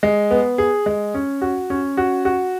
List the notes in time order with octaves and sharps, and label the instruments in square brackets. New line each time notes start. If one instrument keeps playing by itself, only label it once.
[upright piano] G#3
B3
G#4
G#3
C#4
F#4
C#4
F#4
F#4